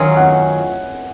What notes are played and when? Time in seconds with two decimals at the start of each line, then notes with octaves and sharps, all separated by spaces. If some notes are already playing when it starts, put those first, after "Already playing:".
Already playing: D#3 F#3 C#4 F4 G#4 G#5
0.16 F#5